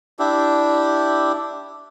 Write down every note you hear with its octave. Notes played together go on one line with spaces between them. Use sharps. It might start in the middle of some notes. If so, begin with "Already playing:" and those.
D4 E4 G4